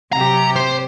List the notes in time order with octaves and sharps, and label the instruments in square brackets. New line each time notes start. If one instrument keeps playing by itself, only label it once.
[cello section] C3 F#3 G4 [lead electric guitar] A#5
[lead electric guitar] C5